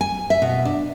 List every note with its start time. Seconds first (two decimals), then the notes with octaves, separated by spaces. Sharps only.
0.01 G#5
0.30 E5
0.42 B2
0.65 D4